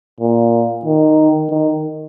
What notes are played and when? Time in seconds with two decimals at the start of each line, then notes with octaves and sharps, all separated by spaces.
0.20 A#2
0.85 D#3
1.50 D#3